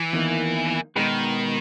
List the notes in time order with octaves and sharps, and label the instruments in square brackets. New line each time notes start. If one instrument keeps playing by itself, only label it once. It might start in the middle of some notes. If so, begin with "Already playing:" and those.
Already playing: [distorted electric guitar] E3
[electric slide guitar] E2 D#3 A#3
[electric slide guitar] B2 G#3 D#4 G#4 B4 [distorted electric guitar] D#3